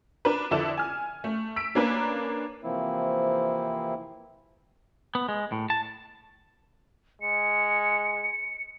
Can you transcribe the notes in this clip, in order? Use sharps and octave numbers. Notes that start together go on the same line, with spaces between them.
D4 A#4 B4
F2 D3 E4 A4 D5 E7
G#5 F6
A3
E6 B6 D7
A#3 C#4 D4 A#4 B4
C3 E3 F3 A#3 C4 E4
B3
G#3
A2
A5
G#3 C#7